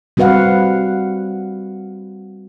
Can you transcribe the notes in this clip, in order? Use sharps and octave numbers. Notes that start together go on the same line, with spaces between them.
G3 C4 F#4 B4 F5 F#5